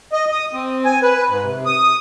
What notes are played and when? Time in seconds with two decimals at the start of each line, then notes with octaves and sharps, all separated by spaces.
0.12 D#5
0.32 D#6
0.53 C4
0.85 G#5
1.03 B4
1.29 G#2
1.43 C3
1.66 D#6